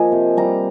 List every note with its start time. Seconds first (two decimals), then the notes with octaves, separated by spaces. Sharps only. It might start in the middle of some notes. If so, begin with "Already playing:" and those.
Already playing: F3 A#3 D#5 G#5
0.12 C3
0.37 G3 A#5